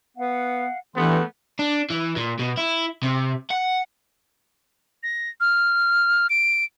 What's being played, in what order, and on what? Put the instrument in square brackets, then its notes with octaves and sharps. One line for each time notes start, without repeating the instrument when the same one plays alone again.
[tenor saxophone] B3 [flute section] F5 F#5
[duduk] E3 [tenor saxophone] A3 [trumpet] B3 [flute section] D4 G4 C6
[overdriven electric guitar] D4
E3
A#2
B2
E4
C3
F#5
[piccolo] A#6
F6
D7